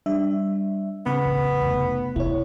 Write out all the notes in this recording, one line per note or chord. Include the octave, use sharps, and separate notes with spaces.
G3 D4 E5
C#3 B3
A1 F2
F1
C3 E4 C#5